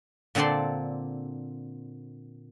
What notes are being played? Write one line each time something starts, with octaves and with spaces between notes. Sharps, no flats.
A#2 D3 C4 A4 D5 C6